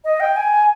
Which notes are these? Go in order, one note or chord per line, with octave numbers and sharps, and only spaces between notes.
D#5
G5
G#5